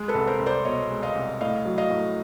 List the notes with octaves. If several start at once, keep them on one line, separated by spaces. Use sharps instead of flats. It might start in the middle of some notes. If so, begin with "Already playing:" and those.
Already playing: G#3
A4 B4
C2
A#4 C5
C2
C5 D5
B2 C#5 D#5
G#3
D#5 F5
C2
A2 D#5 F5
F#3
D#5 F5
A2